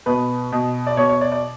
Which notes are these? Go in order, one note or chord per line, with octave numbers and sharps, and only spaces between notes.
B2 B4
B2
D5
B2 C#5
C#5
D5
D5